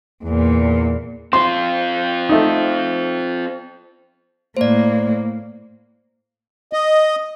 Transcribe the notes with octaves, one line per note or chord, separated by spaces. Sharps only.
E2 A#2
C4 F4 C6
A3 D#4
A2 A#3 C5 D5
D#5